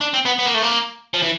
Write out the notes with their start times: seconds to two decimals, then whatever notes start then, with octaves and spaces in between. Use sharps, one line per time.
0.01 D4
0.14 C4
0.25 B3
0.39 B3
0.46 A#3
0.55 A3
0.62 A#3
1.14 F3
1.22 E3